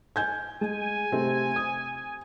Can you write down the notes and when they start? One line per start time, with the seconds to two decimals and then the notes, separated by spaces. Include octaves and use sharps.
0.16 G#5 G6 G#6
0.61 G#3 G#5
1.12 C3 A3 C4
1.56 D#6